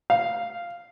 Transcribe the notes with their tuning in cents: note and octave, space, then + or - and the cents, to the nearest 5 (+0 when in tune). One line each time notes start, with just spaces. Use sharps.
F5 -5